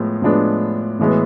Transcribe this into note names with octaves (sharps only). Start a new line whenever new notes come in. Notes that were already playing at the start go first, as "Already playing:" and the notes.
Already playing: A2 F3 G#3 B3
A2 F3 G#3 B3 D4
A2 E3 G#3 B3